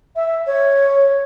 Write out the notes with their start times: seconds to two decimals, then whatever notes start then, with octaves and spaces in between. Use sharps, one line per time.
0.16 E5
0.46 C#5